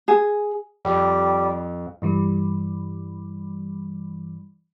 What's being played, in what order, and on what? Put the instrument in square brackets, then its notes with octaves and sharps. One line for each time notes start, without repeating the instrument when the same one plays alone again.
[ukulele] G#4
[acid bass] F2 [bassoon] G3
[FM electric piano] G2 E3 G3